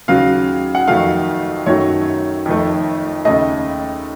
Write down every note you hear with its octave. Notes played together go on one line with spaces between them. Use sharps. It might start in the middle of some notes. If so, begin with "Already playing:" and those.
D#2 C#3 F#3 F5
F#5
F2 D#3 F#3 A3 F5
F#2 D#3 F#3 A3 C#5
F2 D#3 A3
D#2 C#3 A3 D#5